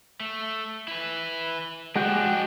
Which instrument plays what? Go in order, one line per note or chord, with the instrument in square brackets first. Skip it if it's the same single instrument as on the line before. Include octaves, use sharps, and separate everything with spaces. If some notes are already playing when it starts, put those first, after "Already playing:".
[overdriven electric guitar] A3
E4 B4
[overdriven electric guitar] F3 D4 [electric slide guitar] G#3 F#4 G4